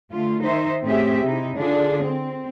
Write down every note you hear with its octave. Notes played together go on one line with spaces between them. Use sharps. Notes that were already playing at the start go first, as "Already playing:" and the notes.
D3 A3 F4
D#3 D#4 C5 E5
A2 C4 C#4 G4 G#4 E5
C3 D#4 E4
D3 D4 F4 G#4
C4